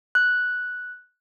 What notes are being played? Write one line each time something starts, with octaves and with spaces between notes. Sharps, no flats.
F#6